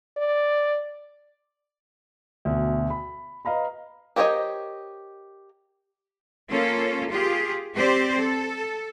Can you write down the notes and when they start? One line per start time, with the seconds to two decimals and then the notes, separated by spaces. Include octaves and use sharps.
0.17 D5
2.45 D2 B2
2.90 B5
3.45 B4 D#5 F5 A#5 B5
4.16 G4 A#4 C5 C#5 D#5
6.50 A#3 C#4 F4 A4
7.09 F4 G4 G#4
7.75 C4 G4 C5 D5
8.17 A4